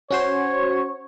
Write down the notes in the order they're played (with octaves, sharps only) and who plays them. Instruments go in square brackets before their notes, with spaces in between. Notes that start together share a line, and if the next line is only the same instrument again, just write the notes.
[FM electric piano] C#4 F#4 C5 [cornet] C#5